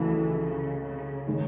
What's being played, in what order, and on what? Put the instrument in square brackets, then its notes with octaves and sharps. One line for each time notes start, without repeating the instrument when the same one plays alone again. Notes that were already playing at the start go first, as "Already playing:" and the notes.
Already playing: [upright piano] C#2 C#3 F#3 A3 [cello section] E3
[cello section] C#3
C#3
[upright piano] D#3 G#3 C#4